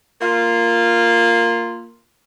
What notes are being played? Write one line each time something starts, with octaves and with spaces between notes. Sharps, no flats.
A#3 F4